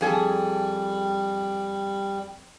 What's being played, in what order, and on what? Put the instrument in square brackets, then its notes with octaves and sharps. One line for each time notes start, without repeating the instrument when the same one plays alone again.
[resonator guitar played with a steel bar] F2 G#4 A4 [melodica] G3